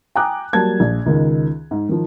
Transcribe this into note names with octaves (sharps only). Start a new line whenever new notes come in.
G5 G#5 A#5 D6 D#6 F#6
F#3 G3 A#3 A5 G#6
A#1
C#2 D#3
G#2
D#3 F3